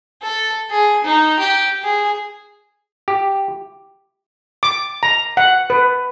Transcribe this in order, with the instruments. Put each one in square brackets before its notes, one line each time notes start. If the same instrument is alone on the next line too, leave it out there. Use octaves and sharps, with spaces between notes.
[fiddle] A4
G#4
D#4
G4
G#4
[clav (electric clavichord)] G4
[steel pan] D6
A#5
F#5
B4